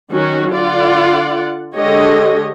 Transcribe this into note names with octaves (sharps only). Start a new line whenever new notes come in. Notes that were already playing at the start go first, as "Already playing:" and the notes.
D#3 F#3 C#4 F#4
D3 F4 D5 F#5
D3 G#3 G4 C#5 D#5